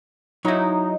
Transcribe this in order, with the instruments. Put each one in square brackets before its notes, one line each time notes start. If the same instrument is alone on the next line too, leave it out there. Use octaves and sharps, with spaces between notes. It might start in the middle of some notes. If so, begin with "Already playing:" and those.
[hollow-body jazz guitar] F#3 E4 [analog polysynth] D#4